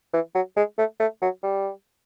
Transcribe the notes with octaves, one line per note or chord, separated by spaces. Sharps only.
E3
F#3
G#3
A3
A3
F#3
G3